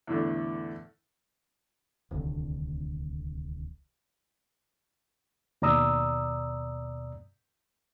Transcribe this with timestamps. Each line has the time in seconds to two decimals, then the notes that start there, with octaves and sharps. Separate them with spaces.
0.07 E2 A2 D3
2.11 D1 C2 D3 D#3
5.62 D#2 B2 D5 A#5 D#6 E6